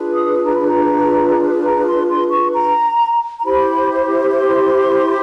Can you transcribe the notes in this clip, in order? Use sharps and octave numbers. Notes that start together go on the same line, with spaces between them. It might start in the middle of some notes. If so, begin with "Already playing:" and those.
Already playing: D4 F4 G#4 B4
D#6
A#5
B5
A#5
A#5
C6
C6
C#6
A#5
A#5
E4 G4 C5 B5
C6